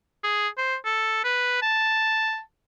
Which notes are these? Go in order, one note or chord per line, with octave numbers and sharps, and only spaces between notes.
G#4
C5
A4
B4
A5